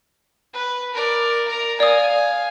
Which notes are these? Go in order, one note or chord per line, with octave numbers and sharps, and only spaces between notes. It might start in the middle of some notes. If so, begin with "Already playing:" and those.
B4
A#4 D5
A#4 A#5
D5 F5 G#5 D#6